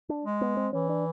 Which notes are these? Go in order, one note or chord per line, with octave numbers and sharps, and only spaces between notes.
D4
G#3
B3
C4
E3 C#4
D4